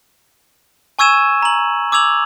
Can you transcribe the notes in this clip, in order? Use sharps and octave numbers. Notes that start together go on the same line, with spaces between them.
G#5 C#6 E6 G#6 D#7 E7
A#5 F#7
D6 E6 G#6 F7 F#7